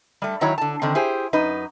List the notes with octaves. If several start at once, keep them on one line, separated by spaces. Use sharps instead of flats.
G3 A3
D#3 F#3 E4 C#5 A#5
D3 A5
D3 D#3 C4
E4 G4 G#4 C5
F#2 D#4 B4